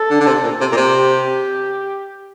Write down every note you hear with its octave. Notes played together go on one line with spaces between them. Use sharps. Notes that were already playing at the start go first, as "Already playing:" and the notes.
Already playing: A4
D3
D3
C3
A#2
C3
A#2
C3
G4